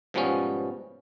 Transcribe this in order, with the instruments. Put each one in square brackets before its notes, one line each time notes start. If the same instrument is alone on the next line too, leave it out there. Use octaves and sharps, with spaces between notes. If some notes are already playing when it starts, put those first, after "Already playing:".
[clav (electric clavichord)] G#2 B2 F3 G3 B3 C#4